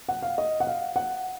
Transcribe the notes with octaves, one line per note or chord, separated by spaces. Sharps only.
F#5
F5
D#5
F#5
F5
F#5